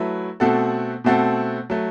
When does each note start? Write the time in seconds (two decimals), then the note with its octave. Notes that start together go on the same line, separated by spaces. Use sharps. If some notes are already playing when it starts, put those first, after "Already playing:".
Already playing: F#3 A3 E4 B4
0.40 B2 A3 C4 F#4 A4
1.04 B2 A3 C4 F#4 A4
1.70 F#3 A3